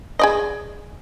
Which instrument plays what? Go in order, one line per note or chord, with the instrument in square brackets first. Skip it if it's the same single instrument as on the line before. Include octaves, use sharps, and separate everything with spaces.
[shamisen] G#4 D5 D#5